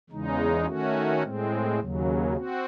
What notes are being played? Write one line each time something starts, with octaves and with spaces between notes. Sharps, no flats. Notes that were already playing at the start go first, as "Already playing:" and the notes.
E2 C#3 G#3 D#4
D#3 A3 C#4 F#4
A2 G#3 C4
D#2 C#3 F#3
C4 F#4